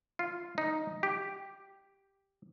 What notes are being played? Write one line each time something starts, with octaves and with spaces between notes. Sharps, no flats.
F4
D#4
G4